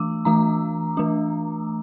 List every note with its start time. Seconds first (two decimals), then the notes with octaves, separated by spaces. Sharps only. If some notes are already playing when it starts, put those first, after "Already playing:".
Already playing: E3 A3 D4 D6 E6
0.25 E3 A3 D4 A#5
0.97 E3 A3 D4